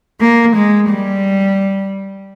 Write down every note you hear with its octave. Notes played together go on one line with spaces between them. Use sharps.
A#3
G#3
G3